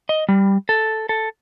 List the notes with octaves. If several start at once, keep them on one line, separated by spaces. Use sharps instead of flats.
D#5
G3
A4
A4